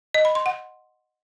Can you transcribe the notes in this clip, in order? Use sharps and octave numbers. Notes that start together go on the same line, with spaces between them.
D#5
B5
C6
F#5